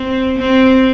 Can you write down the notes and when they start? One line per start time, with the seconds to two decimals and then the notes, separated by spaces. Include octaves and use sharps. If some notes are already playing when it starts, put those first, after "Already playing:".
Already playing: C4
0.38 C4